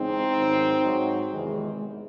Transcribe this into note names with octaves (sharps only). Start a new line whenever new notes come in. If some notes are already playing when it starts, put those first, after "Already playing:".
Already playing: E2 C#3 G#3 C4 D#4
G#2 D#3 F#3
G#2 F#3
E2 C3 D#3 G#3
G#3